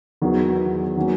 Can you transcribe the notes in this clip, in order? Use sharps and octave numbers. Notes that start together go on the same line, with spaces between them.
E2 D#3 F#3
D#3 F#3 A#3 C#4